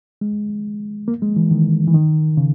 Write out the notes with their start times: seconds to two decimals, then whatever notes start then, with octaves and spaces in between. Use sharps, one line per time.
0.21 G#3
1.08 A#3
1.22 G#3
1.36 E3
1.51 D#3
1.88 E3
1.94 D#3
2.37 C#3